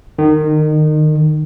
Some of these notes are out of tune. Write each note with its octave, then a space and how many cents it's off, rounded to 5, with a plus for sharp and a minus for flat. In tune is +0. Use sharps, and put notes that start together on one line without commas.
D#3 -25